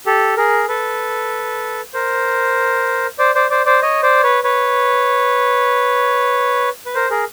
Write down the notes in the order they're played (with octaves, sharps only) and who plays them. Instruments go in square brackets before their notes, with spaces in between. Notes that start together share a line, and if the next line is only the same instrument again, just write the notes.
[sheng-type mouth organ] G4 A4
G#4 A#4
A4 B4
A#4 C5
C5 D5
C5 D5
C5 D5
C5 D5
C#5 D#5
C5 D5
B4 C#5
B4 C#5
B4
A#4 C5
G#4 A#4